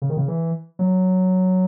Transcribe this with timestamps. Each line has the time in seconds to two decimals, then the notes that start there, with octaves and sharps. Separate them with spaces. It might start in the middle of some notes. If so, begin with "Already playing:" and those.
0.02 C#3
0.10 D#3
0.17 C#3
0.28 E3
0.79 F#3